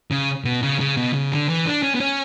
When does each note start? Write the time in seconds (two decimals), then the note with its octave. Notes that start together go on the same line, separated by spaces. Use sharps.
0.11 C#3
0.45 B2
0.63 C#3
0.80 C#3
0.97 B2
1.14 C#3
1.32 D3
1.49 E3
1.66 D4
1.83 C#4
1.95 B3
2.00 C#4